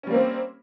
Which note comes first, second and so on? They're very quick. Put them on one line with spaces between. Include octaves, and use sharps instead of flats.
C#4 G3 A#3 C4